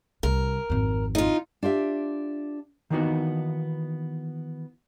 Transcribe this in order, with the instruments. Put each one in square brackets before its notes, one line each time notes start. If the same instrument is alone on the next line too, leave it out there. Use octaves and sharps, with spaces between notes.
[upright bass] C2 [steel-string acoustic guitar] A#4
[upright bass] G#1 F2
[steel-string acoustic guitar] D#4 F4
[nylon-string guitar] D4 F4 G4 E5
[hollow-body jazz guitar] D#3 E3 A#3 B3 D#4 F#4